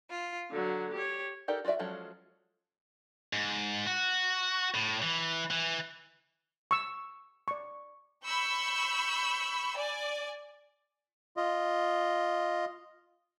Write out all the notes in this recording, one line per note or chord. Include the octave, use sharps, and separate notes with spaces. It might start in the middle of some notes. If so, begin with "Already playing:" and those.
F4
D3 F#3
G4 C#5
D#4 G4 A4 A#4 D5
F4 F#4 B4 D5 E5
F3 F#3 G#3 C#4 A4
G#2
F#4
A2
E3
E3
C#6 E6
D5 C#6
B5 C#6 E6 G6
D5 G#5
F4 D#5